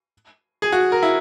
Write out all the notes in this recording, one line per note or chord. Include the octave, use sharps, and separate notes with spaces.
G#4
F#4
A#4
E4